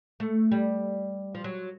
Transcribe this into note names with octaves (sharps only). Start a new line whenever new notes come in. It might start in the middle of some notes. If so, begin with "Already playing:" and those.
A3
G3
F3
F#3